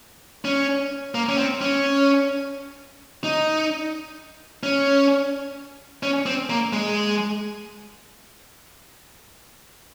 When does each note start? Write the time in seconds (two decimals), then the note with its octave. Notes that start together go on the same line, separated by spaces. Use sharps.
0.45 C#4
1.15 A#3
1.29 C#4
1.38 C4
1.61 C#4
3.24 D#4
4.63 C#4
6.03 C#4
6.26 C4
6.50 A#3
6.73 G#3